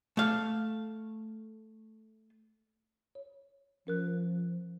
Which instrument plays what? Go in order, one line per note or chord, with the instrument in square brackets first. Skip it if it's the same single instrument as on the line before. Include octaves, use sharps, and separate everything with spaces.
[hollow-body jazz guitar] A3 F5
[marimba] C#5
[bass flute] F3 [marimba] C#4 A#4 F#6